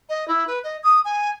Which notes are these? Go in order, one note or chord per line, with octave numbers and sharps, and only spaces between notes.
D#5
E4
B4
D#5
D#6
G#5